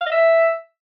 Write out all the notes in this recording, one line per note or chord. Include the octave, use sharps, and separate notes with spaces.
F5
D#5
E5